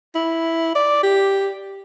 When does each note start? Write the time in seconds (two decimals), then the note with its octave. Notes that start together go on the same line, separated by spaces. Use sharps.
0.15 E4
0.75 D5
1.03 G4